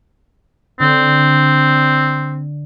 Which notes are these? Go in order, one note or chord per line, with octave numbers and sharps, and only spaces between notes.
D3 C4